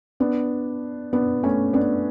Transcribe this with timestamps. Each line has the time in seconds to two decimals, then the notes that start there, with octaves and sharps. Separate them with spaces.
0.20 B3 D4
1.13 B3 D4
1.43 A3 C#4
1.73 B3 D4